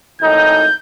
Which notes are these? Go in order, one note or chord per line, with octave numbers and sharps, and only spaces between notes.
G#1 A2 D#4 G6